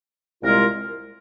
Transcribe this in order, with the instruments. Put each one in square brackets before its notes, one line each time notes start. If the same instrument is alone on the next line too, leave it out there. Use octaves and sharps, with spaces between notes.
[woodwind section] C2 A#2 G#3 F4 A#4